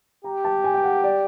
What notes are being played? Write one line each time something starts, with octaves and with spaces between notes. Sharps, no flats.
G4 A#5
A5
G#5
G5
F#5
D5